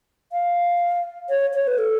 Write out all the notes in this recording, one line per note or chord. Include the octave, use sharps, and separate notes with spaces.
F5
C#5
C#5
B4
A4